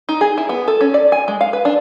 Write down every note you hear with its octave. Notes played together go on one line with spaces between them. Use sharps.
D#4
G#4
E4
B3
A4
C#4
D5
G#5
G#3
F5
B4
D4